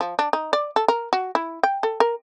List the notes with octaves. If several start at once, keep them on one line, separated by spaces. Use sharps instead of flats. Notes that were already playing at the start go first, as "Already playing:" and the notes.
F3
D4
D#4
D5
A4
A#4
F#4
E4
G5
A4
A#4